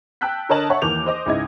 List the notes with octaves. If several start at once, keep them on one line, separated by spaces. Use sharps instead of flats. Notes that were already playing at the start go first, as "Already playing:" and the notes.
G5 A5 E6 F#6 G6 B6
D3 A#4 C#5 D#5 A5 F#7
C#5 E5 F#5 A5 C#6
D#2 E3 A#3 D6 G6 F7
C5 D#5 D6
C#2 G#2 E4 D#5 G#6